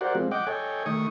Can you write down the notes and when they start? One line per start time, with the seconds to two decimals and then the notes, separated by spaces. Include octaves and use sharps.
0.01 F#4 G4 A#4 C5 D5 F#5
0.15 F3 G#3 C4
0.31 D#5 F#5 G5 D6
0.47 A4 C#5 D#5 G5 G#5
0.86 D#3 A3 C#6 D#6